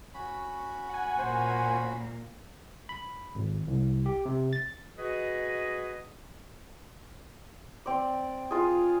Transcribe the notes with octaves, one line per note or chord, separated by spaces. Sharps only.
C#4 F#4 B5
F#5 G#5
A#2 A#3 C5
B5
G#1
C2
G4
C3
A6
F#4 G#4 B4 D#5
C4 D5
F4 G#4